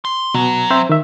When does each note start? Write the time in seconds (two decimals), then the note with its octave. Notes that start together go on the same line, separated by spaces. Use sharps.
0.05 C6
0.34 B2 F#3
0.70 C4 C5 E5
0.89 D#3 E5